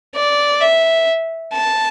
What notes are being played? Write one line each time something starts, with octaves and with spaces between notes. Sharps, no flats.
D5
E5
A5